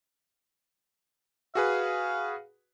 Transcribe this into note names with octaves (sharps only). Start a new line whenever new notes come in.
F#4 G#4 B4 F5